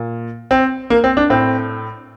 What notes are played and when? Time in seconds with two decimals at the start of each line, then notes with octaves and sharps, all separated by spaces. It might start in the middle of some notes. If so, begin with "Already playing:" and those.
Already playing: A#2
0.51 C4
0.90 A#3
1.04 C4
1.17 D4
1.30 A2 C4